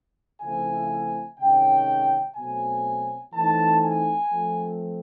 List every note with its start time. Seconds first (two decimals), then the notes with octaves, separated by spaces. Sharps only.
0.41 C#3 F3 A3 C4 E4 G#5
1.38 C3 D#3 G#3 C#4 G5
2.35 B2 F#3 A3 C4 G#5
3.33 E3 A3 C4 D#4 A5
3.82 G#5
4.30 F3 A3 C4